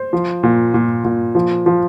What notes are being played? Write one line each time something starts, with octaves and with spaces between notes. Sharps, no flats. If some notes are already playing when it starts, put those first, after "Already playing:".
Already playing: C5
F3
A#2
A#2
A#2
F3
F3